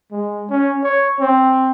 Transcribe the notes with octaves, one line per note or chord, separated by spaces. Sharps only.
G#3
C#4
C#5
C4